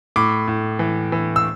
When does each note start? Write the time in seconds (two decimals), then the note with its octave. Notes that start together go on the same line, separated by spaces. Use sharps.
0.16 A2 D6
0.48 A2
0.79 E3
1.12 E3
1.36 E6